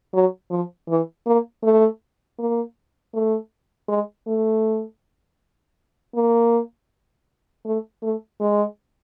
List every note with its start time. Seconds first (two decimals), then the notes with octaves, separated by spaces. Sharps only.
0.13 F#3
0.50 F3
0.88 E3
1.26 A#3
1.63 A3
2.38 A#3
3.14 A3
3.88 G#3
4.27 A3
6.15 A#3
7.65 A3
8.02 A3
8.40 G#3